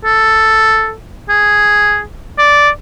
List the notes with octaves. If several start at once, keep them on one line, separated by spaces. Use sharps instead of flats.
A4
G#4
D5